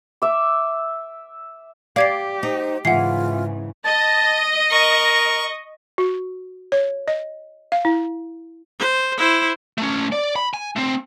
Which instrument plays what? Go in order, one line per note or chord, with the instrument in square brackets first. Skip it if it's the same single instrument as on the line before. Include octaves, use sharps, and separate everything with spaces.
[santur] E5 D6
[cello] G4 [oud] D5 [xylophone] F5 G#6 C7
[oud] D#4 [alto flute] C5
[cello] G#2 C#3 [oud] E3 [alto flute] F4 [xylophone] F#5 C7
[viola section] D#5 [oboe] A5
[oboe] A#4 [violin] C#6
[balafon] F#4
C#5
D#5
F5
E4
[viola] C5
E4 C5
[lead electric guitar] A3 C#4
D5
B5
G#5
A3 C4